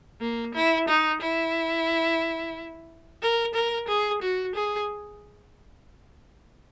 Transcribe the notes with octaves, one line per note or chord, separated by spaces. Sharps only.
A#3
E4
D#4
E4
A#4
A#4
G#4
F#4
G#4